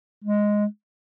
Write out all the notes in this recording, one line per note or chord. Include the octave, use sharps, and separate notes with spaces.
G#3